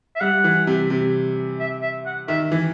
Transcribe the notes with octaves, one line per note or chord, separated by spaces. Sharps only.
E5
G3 F#5
E3
C3
C3
E5
E5
F#5
D#3 E5
E3